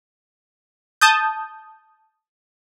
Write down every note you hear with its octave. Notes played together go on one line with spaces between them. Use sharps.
A5 D#6 G6